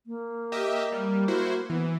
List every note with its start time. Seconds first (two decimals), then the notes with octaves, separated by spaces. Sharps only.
0.06 A#3
0.52 G4 D#5 E5
0.92 G3
1.28 E4 F#4 C5
1.70 E3 B3